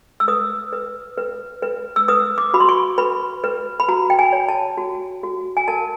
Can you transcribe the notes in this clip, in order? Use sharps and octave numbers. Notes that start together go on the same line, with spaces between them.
E6
B4 D#6
B4
B4
B4
E6
B4 D#6
D6
F#4 B5
C6
C#6
B4 B5
B4
B5
F#4 A#5
G5
G#5
C#5
A5
F#4
F#4
G#5
A#4 A5